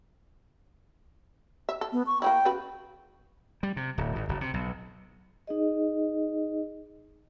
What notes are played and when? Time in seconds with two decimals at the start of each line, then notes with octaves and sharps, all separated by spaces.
1.69 E5
1.81 A4
1.93 B3
2.07 C#6
2.22 A#3 C#4 E4 G5
2.45 C#3 F#4 B4
3.63 G3
3.77 C3
3.98 D1
4.16 G#1
4.29 F#1
4.41 C3
4.54 B1
5.47 D#4 G#4 D#5